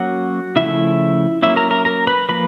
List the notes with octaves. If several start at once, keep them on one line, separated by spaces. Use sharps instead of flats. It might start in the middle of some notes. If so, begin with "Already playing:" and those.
Already playing: F#3 A#3 C#4 F#4 F#5
C#3 F3 A3 E4 E5
F#3 A#3 C#4 E4 E5
A#4 A#5
A#4 A#5
A#4 A#5
B4 B5
F3 A#3 B4 B5